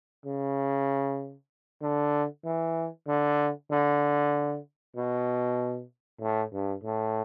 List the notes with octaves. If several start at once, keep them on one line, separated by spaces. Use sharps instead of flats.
C#3
D3
E3
D3
D3
B2
A2
G2
A2